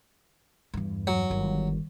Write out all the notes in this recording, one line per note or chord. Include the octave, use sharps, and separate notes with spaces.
E2 G2
F#3
G1 D#3